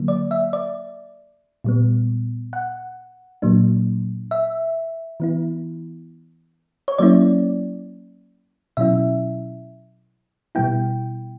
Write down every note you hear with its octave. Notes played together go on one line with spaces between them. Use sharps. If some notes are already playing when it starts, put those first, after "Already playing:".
Already playing: D3 F#3 A#3
D5
E5
D5
A#2 G3 B3
F#5
A#2 F#3 A#3 D4
E5
E3 B3 E4
C#5
F#3 A#3 C#4 E4 D5
B2 F#3 C#4 E4 E5
B2 G3 B3 E4 G5